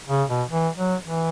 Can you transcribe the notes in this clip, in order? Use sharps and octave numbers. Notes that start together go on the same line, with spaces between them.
C#3
B2
E3
F#3
E3